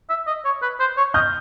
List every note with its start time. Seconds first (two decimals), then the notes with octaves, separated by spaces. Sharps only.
0.10 E5
0.27 D#5
0.45 C#5
0.62 B4
0.80 C5
0.98 C#5
1.14 D#5 F6 G6